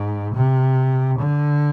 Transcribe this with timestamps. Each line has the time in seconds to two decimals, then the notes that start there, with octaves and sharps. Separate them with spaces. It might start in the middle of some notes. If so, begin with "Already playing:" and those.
Already playing: G#2
0.36 C3
1.19 D3